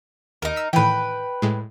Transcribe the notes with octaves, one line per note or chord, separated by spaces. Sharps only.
D#2 D#4 A#4
E6 B6
A2 D#3 E3 B4 G5
A2 G#3